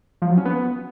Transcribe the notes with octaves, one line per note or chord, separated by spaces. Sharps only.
F3
F#3
C#4
B3